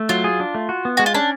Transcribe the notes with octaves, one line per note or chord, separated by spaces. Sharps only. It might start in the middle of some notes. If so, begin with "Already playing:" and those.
Already playing: A3
F#3 F4
G#4
D4
A3
F#4
B3
G#3 F#4
F4
C#4 D4